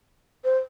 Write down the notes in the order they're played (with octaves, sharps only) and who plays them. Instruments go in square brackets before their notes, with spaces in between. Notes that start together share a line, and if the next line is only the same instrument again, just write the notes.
[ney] C5